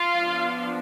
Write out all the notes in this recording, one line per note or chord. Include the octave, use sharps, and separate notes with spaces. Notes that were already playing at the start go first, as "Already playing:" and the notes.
Already playing: F4 F5
F3 B3 D4